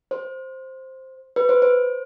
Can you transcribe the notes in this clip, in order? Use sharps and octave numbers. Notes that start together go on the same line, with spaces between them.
C5
B4
C5
C5